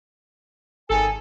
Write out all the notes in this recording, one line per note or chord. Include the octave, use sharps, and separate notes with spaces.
G#1 D#3 G#4 A4 G#5